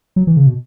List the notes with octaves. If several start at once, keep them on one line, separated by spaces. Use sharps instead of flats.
F#3
E3
C#3
B2